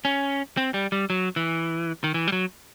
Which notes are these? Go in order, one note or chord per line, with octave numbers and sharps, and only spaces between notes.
C#4
C4
G3
G3
F#3
E3
D#3
E3
G3
F#3